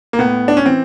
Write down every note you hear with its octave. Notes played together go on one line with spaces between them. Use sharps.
A#3
A2 B3
D4
C#4
E3 C4